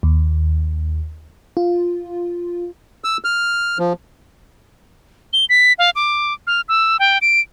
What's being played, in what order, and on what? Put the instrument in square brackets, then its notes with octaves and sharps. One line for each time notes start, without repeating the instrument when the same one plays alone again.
[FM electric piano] D#2
F4
[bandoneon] E6
F6
F3
[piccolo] G7
B6
F5
D6
F6
E6
G5
D7